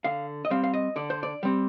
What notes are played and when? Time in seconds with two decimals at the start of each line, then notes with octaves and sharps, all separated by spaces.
0.04 D3 F5
0.45 D#5
0.50 G3 C4 F5
0.64 F5
0.74 D#5
0.96 D3 D5
1.10 C5
1.23 D5
1.43 G3 C4